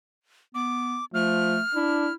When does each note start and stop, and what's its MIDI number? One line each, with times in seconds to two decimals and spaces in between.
0.55 0.99 59
0.55 1.05 86
1.14 1.57 53
1.14 1.61 57
1.14 2.13 89
1.74 2.08 62
1.74 2.15 64